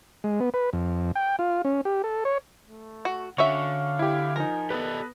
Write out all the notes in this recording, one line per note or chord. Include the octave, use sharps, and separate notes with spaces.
G#3
B3
B4
F2
G5
F4
C#4
G4
A4
C#5
A3
F#4
D3 C#4 F#4 E5 F5 C#6
E4 G4
F3 D#4 A#4 G#5
B3 G4 A4 B4 D5 D#5